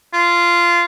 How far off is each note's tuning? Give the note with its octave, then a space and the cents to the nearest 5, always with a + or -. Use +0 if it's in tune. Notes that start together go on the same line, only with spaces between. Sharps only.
F4 -15